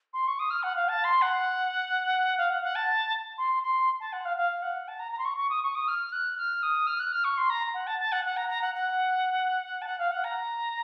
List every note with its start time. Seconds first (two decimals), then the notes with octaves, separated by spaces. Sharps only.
0.13 C6
0.27 C#6
0.39 D#6
0.50 F6
0.62 F#5
0.76 F5
0.88 A5
1.04 C6
1.21 F#5
2.37 F5
2.49 F#5
2.63 F#5
2.75 A5
3.38 C6
3.63 C6
4.00 A5
4.12 F#5
4.25 F5
4.37 F5
4.62 F#5
4.88 A5
4.99 A#5
5.12 A#5
5.18 C6
5.24 C#6
5.37 C#6
5.49 D#6
5.63 C#6
5.75 D#6
5.88 F6
6.12 F#6
6.37 F6
6.62 D#6
6.87 F6
6.99 F#6
7.12 F6
7.24 C#6
7.37 C6
7.50 A#5
7.74 F#5
7.87 A5
7.99 A5
8.12 F#5
8.24 F#5
8.36 A#5
8.49 A#5
8.61 F#5
8.74 F#5
9.81 A5
9.86 F#5
9.98 F5
10.11 F#5
10.24 A#5